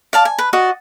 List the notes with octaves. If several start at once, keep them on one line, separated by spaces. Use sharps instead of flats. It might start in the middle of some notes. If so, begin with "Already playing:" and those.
D5 F5 A5
G#5
B4
F#4 D5 D#5